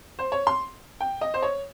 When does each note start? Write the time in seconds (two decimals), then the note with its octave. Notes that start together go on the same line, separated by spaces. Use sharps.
0.19 C5
0.32 C#5
0.47 C6
1.01 G5
1.21 D#5
1.34 C5
1.42 C#5